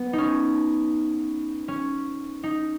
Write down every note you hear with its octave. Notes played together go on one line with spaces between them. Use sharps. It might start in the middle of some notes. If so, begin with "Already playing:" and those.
Already playing: B3
D#4
C#4
C#4
D#4